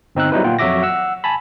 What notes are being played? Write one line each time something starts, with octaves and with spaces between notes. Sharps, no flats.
G1 C4 D#4 E6 F#6
F#3 G3 B3 D#4 E4 B4
A#2 F4 F#5 G5
F2 F#3 F#4 E5 D6 A#6
F#5 E6
G#5 A5 B5